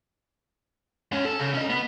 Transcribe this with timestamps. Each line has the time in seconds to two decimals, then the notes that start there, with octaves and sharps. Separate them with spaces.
1.12 G#2 C#4
1.25 A4
1.40 C#3
1.54 C#4 D#5
1.70 B3